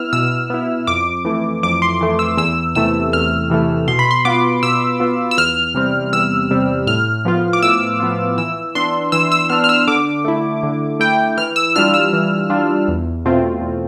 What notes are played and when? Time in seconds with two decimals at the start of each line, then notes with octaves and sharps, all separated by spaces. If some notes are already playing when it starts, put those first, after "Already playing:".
Already playing: B3 E4 E6 F6
0.13 B2 E6
0.50 B3 E4
0.87 F2 D6
1.25 E3 A3
1.63 F2 D6
1.82 C6
2.01 E3 A3
2.19 E6
2.37 E2 E6
2.75 C3 E3 A3 E6
3.13 E2 F6
3.50 C3 E3 A3
3.88 B2 C6
3.99 B5
4.11 C6
4.25 B3 F4 D6
4.63 B2 E6
5.00 B3 F4
5.31 E6
5.37 E2 F6
5.75 C3 G3 C4
6.13 E2 E6
6.50 C3 G3 C4
6.87 A2 F6
7.25 F3 B3 F4
7.53 D6
7.63 A2 E6
8.00 F3 B3 F4
8.38 E3 E6
8.75 B3 D4 C6
9.12 E3 E6
9.32 E6
9.50 B3 D4 F6
9.64 F6
9.69 E6
9.87 D3 D6
10.25 A3 E4
10.63 D3
11.00 A3 E4 G5
11.37 E3 F6
11.56 E6
11.76 G3 D4 F4 F6
11.94 E6
12.13 E3
12.50 G3 D4 F4
12.88 E2
13.25 B2 A3 C4 F4
13.62 E2